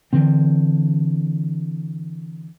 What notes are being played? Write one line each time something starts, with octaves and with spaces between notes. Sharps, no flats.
D3 E3 C4